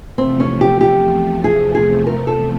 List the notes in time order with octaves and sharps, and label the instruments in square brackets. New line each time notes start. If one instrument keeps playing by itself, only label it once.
[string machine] E2 C3 F3 A3 [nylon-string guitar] C4
[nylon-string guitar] C#4
G4
G4
G#4
G#4
A#4
A4